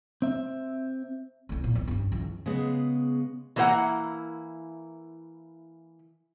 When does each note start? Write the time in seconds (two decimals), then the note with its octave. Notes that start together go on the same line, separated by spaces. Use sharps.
0.22 C4 E5
1.49 C2 A3
1.64 A#2
1.75 B1 E3
1.88 G2 C#4
2.12 C#2 E3
2.46 C#3 G#3 B3
3.56 E3 A#3 E4 C5 F#5 A#5